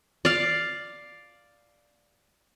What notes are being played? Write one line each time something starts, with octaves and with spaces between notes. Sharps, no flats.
D5 F5